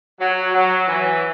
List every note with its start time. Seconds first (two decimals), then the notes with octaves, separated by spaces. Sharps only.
0.20 F#3
0.54 F#3
0.88 E3